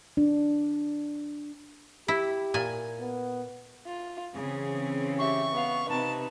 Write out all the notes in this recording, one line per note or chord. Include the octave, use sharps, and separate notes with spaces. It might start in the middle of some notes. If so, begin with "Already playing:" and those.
D4
E4 G4
A#2 G#5
B3
F4
C#3 E3 C4 G#4
G4 E5 C#6
B3 F5
C3 D#4 B4 A5